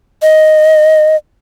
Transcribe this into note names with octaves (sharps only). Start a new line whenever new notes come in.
D#5